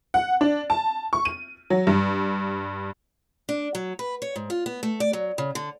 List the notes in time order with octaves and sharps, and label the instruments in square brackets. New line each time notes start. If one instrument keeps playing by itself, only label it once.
[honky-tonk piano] F#5
D4
A5
C#6
D#7
F#3
G2
[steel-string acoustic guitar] D4
F#3
B4
C#5
G#2
F4
B3
A3
D5
F#3
C#3
D3